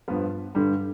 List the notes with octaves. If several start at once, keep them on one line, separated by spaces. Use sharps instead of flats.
G2 F3 B3
G2 D3 G3